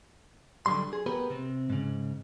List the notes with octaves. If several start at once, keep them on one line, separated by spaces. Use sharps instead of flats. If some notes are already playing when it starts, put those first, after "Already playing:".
D3 F#3 G3 C6
G#4
B3 G4 A#4 B4
C3 C4
G#2 C#3